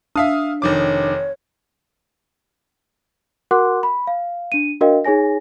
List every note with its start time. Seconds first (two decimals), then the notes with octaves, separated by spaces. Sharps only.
0.16 D4 E5 F5 D#6
0.62 F1 D#3 C#5 D6
3.51 F#4 A#4 F#5 C6 D6 F#6
3.83 B5
4.07 F5
4.52 D4 D#7
4.81 D4 F#4 A#4 D#5 F5 G5
5.05 D#4 G#4 C#5 G#5 A#6